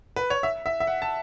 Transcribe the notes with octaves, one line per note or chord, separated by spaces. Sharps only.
B4
C#5
E5
E5
E5
F#5
A5